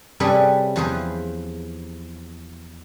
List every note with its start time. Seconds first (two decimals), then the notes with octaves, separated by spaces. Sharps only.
0.20 C3 G3 C#4 G#4 A4 B4
0.76 E2 F3 G#4 B4 C5